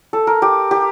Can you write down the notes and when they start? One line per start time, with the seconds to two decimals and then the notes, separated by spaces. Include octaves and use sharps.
0.13 A4
0.27 A#4
0.42 G4
0.71 G4